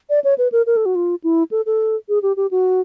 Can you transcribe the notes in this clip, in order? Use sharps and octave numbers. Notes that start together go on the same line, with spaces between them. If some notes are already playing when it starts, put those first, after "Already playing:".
D5
C#5
B4
A#4
A#4
A4
F#4
F4
E4
A4
A4
G#4
G4
G4
F#4